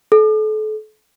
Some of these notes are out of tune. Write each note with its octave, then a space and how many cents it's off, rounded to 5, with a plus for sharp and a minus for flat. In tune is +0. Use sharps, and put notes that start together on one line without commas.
A4 -35